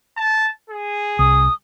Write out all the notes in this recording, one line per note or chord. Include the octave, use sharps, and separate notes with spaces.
A5
G#4
C2 D#6